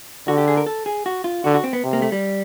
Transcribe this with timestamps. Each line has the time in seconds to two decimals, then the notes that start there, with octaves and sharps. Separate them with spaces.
0.27 D3 F#4
0.38 G4
0.48 G#4
0.57 A#4
0.66 A4
0.86 G#4
1.06 F#4
1.24 F4
1.44 D3 F#4
1.54 F#4
1.64 C4
1.73 B3
1.83 C3
1.93 A#3
2.02 A3
2.12 G3